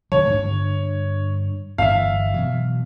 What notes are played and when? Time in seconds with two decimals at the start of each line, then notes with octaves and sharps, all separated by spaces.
0.12 D1 D3 F#3 C#5
0.29 G2 D3 D4
1.78 G1 G2 E3 E5 F5
2.34 B2 E3 F#3